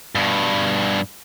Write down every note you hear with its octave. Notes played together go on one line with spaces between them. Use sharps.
G2 B2